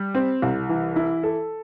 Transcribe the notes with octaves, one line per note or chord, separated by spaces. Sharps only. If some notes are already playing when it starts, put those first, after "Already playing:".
Already playing: G3
C4
C2
E3
E4
A4